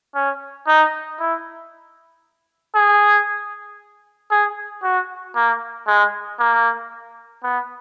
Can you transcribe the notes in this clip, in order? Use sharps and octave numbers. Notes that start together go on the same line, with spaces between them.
C#4
D#4
E4
G#4
G#4
F#4
A#3
G#3
A#3
B3